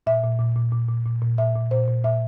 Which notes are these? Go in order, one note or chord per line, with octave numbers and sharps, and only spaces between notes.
A#2 E5
A#2
A#2
A#2
A#2
A#2
A#2
A#2
A#2 E5
A#2
A#2 C5
A#2
A#2 E5